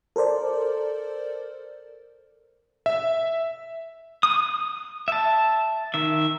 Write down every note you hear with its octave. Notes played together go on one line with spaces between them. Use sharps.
A4 A#4 C5 D5
E5
D#6
E5 A5
D#3 E5